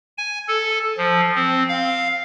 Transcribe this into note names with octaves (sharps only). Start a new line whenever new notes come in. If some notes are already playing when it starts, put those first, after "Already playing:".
G#5
A4
F3
C4
F5